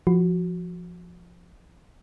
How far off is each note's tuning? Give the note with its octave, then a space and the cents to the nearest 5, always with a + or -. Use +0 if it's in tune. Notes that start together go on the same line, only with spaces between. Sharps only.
F3 +0 F#4 +0